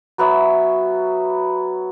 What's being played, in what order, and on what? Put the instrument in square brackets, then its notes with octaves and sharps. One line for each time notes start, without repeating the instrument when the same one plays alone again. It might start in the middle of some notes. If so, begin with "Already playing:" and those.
[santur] F#3 B3 C#5 E5